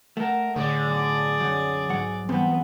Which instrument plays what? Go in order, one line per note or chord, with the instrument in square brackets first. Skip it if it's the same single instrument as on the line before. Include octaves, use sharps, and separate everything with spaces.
[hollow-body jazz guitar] A3 [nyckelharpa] A#4 [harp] F#5 A5
[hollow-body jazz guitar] A2 [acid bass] D3 [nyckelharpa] G#4 D5
[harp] B1
[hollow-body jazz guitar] F#2 [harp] F#3 C#7
[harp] G#2 [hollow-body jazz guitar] F#3 F#5
[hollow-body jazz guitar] E2 C4 [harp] G3 A4 F#5 [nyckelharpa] B3